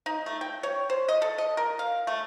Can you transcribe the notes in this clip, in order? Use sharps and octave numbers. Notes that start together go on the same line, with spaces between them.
D#4
A3
G5
C#5
C5
D#5
A4
D#5
A#4
F5
A3